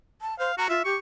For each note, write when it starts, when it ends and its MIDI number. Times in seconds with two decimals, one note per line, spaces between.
0.21 0.37 81
0.39 0.52 72
0.39 0.54 77
0.58 0.66 66
0.58 0.68 82
0.69 0.83 65
0.69 0.82 76
0.85 0.94 67
0.85 0.97 85